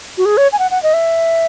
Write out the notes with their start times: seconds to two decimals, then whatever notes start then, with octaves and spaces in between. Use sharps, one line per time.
0.18 F#4
0.25 G#4
0.37 C#5
0.52 G#5
0.59 F#5
0.71 F#5
0.83 D#5
0.94 E5